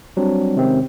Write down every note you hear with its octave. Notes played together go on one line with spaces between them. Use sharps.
F#3 G3 C4 D4
C3 D#3 G#3 C4 C#4